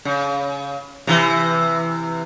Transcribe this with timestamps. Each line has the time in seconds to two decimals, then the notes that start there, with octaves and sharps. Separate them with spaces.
0.05 C#3
1.07 C3 E3